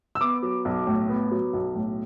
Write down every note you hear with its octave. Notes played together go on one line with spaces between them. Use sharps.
E6
B3 D6
F#3
B1
A2
B3
F#3
B1
A2